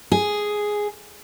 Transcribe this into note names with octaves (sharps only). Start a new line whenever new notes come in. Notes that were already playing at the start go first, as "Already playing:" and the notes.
G#4